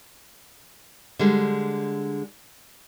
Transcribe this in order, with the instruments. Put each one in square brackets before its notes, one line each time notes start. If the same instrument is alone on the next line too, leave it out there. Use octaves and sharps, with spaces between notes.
[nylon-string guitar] D3 G3 G#3